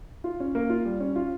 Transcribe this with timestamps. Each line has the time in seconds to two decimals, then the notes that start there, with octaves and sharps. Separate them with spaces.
0.24 F4
0.40 C#4
0.55 A#3
0.70 F4
0.85 G3
1.00 C#4
1.16 F4